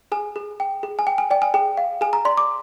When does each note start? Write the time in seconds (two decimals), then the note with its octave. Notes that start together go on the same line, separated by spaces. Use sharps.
0.12 G#4 G#5
0.36 G#4
0.60 G5
0.83 G#4
0.99 G#5
1.07 G5
1.18 G#5
1.30 D5 G5
1.42 G#5
1.54 G#4 G5
1.77 F5
2.01 G#4 G#5
2.13 A#5
2.25 D5 C6
2.37 D6